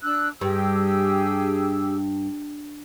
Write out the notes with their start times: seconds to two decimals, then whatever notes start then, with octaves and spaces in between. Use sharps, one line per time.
0.03 D4 E6 F#6
0.41 G2 G4 G#4 E6